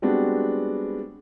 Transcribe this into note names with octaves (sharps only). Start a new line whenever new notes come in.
G3 G#3 B3 C4 D4 F#4